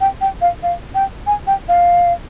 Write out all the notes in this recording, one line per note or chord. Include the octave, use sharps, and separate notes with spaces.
G5
G5
F5
F5
G5
G#5
G5
F5